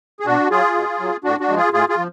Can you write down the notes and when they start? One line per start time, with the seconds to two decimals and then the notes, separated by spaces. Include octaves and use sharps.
0.20 G#4
0.26 B2 D4 F#4
0.50 F#3 F4 G#4
0.75 B2
1.00 F#3
1.24 A2 D4 F#4
1.40 D4 F#4
1.48 F3 G#3
1.57 F4 G#4
1.73 A2 F4 G#4
1.89 F4 G#4
1.98 F3